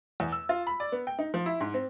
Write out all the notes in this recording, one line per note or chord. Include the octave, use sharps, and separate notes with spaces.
E2
E6
F4
B5
D5
B3
G5
D#4
F3
E4
G#2
C4